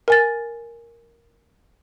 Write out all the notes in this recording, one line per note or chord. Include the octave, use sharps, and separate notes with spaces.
A#4 G#5 A6